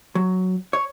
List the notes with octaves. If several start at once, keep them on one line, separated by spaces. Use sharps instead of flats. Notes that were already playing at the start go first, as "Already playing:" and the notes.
F#3
C#5